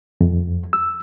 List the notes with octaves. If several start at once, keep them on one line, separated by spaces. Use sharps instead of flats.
F2
E6